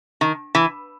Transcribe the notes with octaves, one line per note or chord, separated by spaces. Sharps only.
D#3
E3